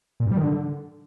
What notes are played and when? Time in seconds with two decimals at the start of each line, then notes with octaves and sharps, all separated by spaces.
0.20 A#2
0.26 G2
0.31 G3
0.37 D#3
0.43 D3